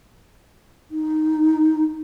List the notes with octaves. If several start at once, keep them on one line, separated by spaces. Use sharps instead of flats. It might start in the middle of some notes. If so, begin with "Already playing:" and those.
D#4